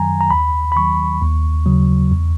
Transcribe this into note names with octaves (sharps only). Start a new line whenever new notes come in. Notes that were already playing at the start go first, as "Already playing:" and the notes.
Already playing: F#2 D#3 F#3 G#5 A#5
A#5
D#2 B5
B5
D#3 F#3 C#6
D#2
C#3 F#3
E2